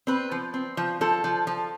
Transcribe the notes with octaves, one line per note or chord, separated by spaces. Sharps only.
C4 B4
F3
C4
F3
F3 A4
F3
F3